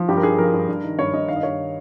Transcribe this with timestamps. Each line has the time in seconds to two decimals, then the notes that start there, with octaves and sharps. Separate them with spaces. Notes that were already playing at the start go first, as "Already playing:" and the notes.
Already playing: F3
0.08 G2 G4
0.17 A#4
0.23 G2 G#4
0.38 F3 A#4
0.53 G2
0.68 G2
0.83 D#3
0.98 G2 C#5
1.13 G2 D#5
1.28 D#3 F5
1.36 D#5
1.43 G2 C#5